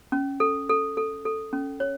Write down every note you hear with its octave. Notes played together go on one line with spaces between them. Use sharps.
C#4
A4
A4
A4
A4
C#4
C#5